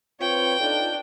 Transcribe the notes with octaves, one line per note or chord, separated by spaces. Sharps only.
C4 F4 B4 C#5 G5
D4 D#4 F4 A4